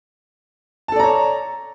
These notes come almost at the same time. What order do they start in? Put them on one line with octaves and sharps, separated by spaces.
A5 A4 D5 A#5 C#5